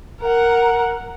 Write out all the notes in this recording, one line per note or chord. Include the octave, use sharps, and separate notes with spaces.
A#4 F#5